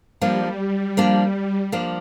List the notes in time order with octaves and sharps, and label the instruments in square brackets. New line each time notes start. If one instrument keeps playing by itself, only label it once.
[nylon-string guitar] F3 A#3 D4 [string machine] G3
[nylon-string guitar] F3 A#3 D4
F3 A#3 D4